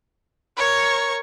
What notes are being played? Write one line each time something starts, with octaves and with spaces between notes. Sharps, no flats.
A#4 C#5 C#6